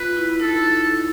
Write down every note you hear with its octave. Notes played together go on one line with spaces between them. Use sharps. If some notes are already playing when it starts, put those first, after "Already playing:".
Already playing: F4 B4
E4
D#4 A4